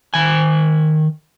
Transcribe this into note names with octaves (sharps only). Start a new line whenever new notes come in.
D#3 G#5